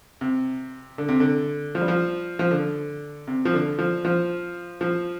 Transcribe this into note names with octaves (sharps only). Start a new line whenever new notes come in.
C3
D3
C3
D3
F3
G3
F3
F3
D3
C3
F3
D3
F3
F3
F3